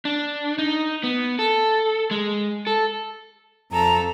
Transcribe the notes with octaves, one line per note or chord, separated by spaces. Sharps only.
D4
D#4
B3
A4
G#3
A4
F2 A4 A#5